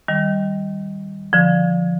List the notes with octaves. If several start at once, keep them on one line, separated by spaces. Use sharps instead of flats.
D#3 G3
D3 F3